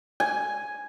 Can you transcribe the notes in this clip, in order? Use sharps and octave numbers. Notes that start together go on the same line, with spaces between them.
G#5